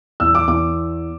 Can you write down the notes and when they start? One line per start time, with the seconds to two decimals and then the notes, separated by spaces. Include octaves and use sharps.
0.20 E2 E6
0.35 D6
0.48 E2 D6